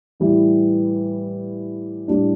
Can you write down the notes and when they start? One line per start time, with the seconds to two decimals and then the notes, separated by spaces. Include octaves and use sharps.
0.20 A2 E3 G3 E4
2.08 A2 G3 D4